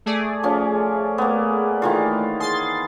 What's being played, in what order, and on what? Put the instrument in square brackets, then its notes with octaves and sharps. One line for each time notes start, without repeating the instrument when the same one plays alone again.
[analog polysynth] A3 G#4 D5
[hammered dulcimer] F3 C#4
A#3 B3
D#3 E3 F4
[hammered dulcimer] G#4 [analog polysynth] C6 A6